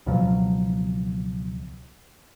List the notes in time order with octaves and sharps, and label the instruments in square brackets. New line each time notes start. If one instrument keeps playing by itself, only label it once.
[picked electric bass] C#2 B2 F3 F#3